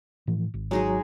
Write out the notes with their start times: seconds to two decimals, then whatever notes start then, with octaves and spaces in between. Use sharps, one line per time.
0.27 A2 E3 F3
0.54 G#1
0.71 F#3 G#3 D#4 G#4